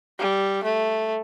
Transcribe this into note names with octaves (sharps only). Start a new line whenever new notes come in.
G3
A3